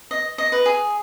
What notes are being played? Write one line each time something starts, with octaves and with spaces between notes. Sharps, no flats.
D#5
D#5
B4
G#4